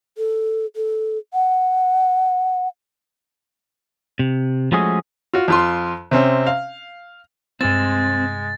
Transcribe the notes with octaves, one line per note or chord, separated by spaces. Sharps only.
A4
A4
F#5
C3
F3 G#3 A3 C#4 F#4 G#4
F4 F#4
F2 F4 C6
C3 C4 C#4
F5
G2 C3 G#3 C4 A6